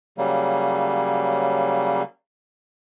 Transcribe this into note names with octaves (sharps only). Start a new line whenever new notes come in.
C#3 F#3 G3 A#3